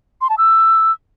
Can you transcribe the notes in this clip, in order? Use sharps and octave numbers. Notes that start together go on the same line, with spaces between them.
C6
A5
E6